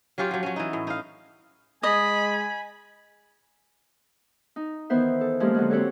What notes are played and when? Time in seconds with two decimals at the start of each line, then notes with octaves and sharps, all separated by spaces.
0.18 F#3 C#4 F4 G4
0.31 F3 F#3
0.43 F#3 C#4
0.56 E3 D#4
0.73 A2
0.87 D#4 F5
1.83 G#3 D#5 G#5 B5
4.56 D#4
4.90 D#3 E3 B3 C5 E5
5.21 A4
5.40 F3 G#3 A#3 C#4 G4
5.55 D3 F#3 G#3
5.71 C4 F#4 G4 A4 C#5